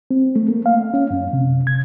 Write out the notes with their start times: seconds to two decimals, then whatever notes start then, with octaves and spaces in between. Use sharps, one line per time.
0.11 C4
0.36 A3
0.49 A#3
0.66 F5
0.94 C#4
1.10 F#2
1.33 C3
1.67 G#6